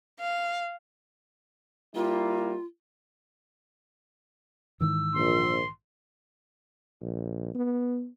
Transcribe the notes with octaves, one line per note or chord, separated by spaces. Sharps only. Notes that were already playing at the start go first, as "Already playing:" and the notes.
F5
G3 A#3 E4 F4
G#2 D#3 E3 E6
A#1 C6
A#1
B3